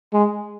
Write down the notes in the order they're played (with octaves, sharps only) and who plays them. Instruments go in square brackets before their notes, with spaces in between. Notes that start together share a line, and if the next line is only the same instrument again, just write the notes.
[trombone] G#3